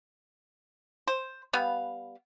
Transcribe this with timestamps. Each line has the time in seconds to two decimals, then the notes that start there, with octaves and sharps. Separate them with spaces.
1.08 C5
1.53 G3 B3 F5